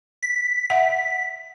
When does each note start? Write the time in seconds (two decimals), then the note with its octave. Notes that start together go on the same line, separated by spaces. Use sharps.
0.23 B6
0.70 E5 F#5